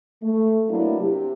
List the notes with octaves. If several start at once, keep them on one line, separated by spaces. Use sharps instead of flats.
A3
F#3 A#3 B3 D4 E4
C3 G4